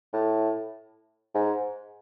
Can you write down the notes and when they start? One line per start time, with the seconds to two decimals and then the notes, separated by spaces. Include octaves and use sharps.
0.13 A2
1.35 G#2